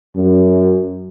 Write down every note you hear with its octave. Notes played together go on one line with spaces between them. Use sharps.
F#2